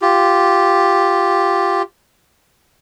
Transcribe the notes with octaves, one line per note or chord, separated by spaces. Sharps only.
F4 G4